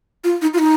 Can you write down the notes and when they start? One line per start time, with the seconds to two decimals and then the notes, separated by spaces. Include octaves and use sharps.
0.24 F4
0.42 D#4
0.54 F4
0.59 D#4